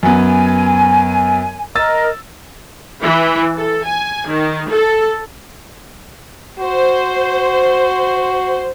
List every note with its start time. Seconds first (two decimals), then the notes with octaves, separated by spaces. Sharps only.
0.03 F#2 B3 G#5
1.75 A#4 D#5 E6 A6
3.03 E3
3.56 A4
3.86 G#5
4.27 D#3
4.70 A4
6.59 F#4 C5